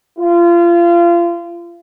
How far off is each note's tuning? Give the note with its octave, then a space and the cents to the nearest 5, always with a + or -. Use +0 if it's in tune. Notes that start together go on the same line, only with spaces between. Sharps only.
F4 -30